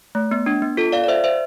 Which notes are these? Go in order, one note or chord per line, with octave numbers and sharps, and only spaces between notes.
A3
B3
D4
B3
F4 A4
D5 F5
D5
C5 E5
C5 E5